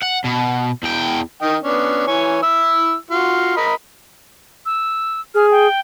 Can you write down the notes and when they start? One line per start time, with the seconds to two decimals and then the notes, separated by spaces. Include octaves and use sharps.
0.02 F#5
0.24 B2
0.83 E2 G5
1.42 D#3 D#5 G5
1.63 B3 C#4 D4
2.07 E3 C#5 G#5
2.43 E4 E6
3.11 F4 F#4
3.57 A#4 D#5 B5
4.66 E6
5.35 G#4 F6
5.51 G5